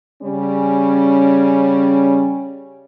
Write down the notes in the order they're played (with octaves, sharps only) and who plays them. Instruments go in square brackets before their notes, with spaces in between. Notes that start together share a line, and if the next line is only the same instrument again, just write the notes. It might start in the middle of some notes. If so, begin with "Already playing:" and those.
[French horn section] C#3 G3 C#4